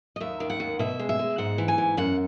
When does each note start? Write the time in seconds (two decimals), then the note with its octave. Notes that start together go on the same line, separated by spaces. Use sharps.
0.16 D#5
0.20 D#2 E5
0.40 D#3
0.50 F#5
0.60 D#2
0.79 B2 E5
0.99 G#3
1.09 E5
1.19 G#3
1.38 G#2 F#5
1.58 E3
1.68 G#5
1.78 G#2
1.97 F#2 F#5